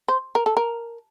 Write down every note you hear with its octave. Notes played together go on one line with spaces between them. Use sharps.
C5
A#4
A4
A#4